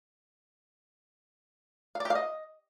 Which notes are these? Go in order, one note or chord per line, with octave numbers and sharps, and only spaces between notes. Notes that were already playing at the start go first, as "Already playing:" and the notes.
F5
D5
G4
F5
D#5